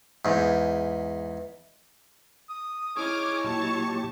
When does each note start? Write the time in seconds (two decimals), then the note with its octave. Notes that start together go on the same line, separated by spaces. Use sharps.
0.25 E2 G#2
2.50 D#6
2.96 D#4 E4 G#4 C#5 D6 D#6 F6 G#6
3.44 A#2 F#3 G4 A5 C#6